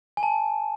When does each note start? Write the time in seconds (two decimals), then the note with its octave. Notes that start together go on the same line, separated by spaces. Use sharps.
0.17 G#5
0.23 A5